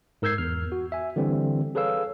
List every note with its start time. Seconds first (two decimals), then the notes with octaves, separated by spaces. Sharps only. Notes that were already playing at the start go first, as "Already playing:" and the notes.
0.22 G#2 A#4 E6 G6 G#6 C7
0.38 E2 F6
0.72 F#4
0.92 E5 G#5
1.16 D3 E3 G3 C4
1.75 G#4 A4 B4 C#5 F5 E6